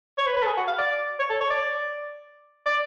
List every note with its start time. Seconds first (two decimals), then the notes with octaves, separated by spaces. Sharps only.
0.18 C#5
0.27 B4
0.37 B4
0.43 A4
0.46 G#4
0.57 F#4
0.68 F5
0.79 D5
1.20 C#5
1.30 A4
1.41 C#5
1.50 D5
2.66 D5